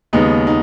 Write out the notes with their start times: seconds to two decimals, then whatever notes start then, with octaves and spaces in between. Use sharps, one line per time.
0.13 D#2 C#3 G#3 B3 D#4
0.47 D#4